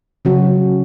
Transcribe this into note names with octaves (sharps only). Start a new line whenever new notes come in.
C#3 F#3 C#4 F#4